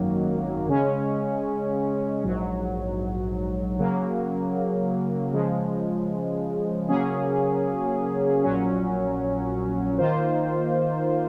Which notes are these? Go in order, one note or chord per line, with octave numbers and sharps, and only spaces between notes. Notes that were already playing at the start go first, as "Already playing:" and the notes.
Already playing: G#1 F#2 D#3 F#3 A#3
C#3 G#3 C#4
A#1 G#2 F#3
C#3 F#3 A#3
C#3 F3 G#3
C#3 F#3 A#3 C#4 G#4
A#1 A#2 F#3 C#4
D#3 A#3 F4 C5